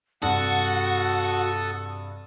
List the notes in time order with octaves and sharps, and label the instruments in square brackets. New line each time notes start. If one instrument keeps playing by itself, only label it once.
[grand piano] G2 C3 [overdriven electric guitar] F#4 [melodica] A4 A5 D#6 [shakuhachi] F#5